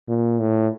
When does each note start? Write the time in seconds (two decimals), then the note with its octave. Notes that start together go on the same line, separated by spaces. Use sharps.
0.08 A#2
0.39 A2